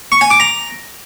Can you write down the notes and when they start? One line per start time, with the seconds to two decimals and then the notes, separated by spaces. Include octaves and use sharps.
0.12 C#6
0.21 G#5
0.30 D6
0.40 A#5